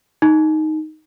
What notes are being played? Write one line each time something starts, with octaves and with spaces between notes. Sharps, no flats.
D#4